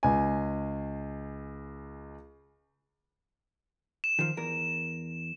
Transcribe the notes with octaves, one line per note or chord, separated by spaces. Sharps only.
C#2 G#5
E7
D#3 F3
E2 A#4